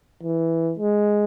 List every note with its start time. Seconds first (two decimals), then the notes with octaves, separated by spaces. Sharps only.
0.23 E3
0.79 G#3